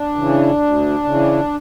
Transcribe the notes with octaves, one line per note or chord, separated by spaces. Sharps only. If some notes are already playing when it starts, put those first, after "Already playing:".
Already playing: D4
C#3 E3
D2
C#3 E3